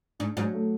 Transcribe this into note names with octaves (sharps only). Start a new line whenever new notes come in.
G#2 D4
G#2 F#3
A3